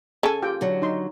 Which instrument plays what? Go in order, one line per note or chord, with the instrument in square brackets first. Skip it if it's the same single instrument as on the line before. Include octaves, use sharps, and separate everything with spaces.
[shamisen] C#3 A4 [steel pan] G#5
[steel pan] F4 G4 G5
[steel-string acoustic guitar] D3 F#3
[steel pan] D#4 C6